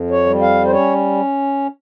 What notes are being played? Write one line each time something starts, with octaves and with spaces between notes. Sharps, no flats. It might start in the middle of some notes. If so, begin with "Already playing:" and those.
Already playing: F2
C#5
G3
F5
C5
C#4 C#5